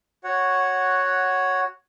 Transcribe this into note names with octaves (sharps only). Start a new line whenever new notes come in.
F#4 C#5 F#5